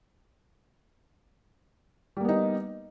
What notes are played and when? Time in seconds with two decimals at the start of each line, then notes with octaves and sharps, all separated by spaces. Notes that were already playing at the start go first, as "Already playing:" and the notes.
2.17 G3
2.21 A#3
2.25 B3
2.29 D#4